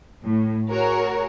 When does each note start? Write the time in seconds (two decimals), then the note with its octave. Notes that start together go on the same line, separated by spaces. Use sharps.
0.24 A2
0.70 F#4 G#4 A#4 C#5